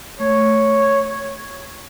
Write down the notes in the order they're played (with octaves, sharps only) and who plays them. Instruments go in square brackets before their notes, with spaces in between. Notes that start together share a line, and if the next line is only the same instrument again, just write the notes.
[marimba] A3 [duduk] C#5